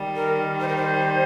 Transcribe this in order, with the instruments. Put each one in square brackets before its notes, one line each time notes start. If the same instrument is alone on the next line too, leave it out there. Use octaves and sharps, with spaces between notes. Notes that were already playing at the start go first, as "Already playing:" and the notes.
Already playing: [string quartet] D#3 G3
[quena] A#4
C5
A#4
C5